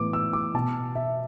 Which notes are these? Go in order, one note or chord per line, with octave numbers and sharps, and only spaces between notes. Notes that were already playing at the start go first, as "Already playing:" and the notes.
Already playing: A2 E3 B3 D6
E6
D6
B2 B3 A5
E5